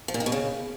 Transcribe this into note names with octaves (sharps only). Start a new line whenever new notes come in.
F3
A#2
D#3
B2
C#3